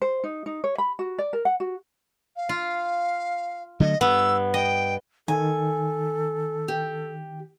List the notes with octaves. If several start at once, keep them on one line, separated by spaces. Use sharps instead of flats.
C5
D#4
D#4
C#5
B5
F#4
D5
A#4
F#5
F#4
F5
F4
D3 F#3 A3 D#5
G2 B3 E6
D#5 G5
D#3 A4 G#5
G4